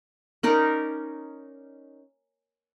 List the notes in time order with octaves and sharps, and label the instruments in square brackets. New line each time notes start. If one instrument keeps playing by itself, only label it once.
[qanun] C#4 D#4 A#4 D5